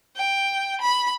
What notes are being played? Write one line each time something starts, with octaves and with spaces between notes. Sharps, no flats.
G5
B5